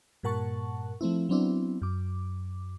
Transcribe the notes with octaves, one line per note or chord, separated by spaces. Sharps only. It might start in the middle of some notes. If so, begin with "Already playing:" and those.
G2 A#2 A#4 F#5 A5 C#6
F3 A3 C4 E4
F#3 B3 C4 D4 E4
F#2 D6